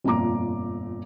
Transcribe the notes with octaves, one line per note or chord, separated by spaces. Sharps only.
G1 F2 A#2 F4 A#5 D6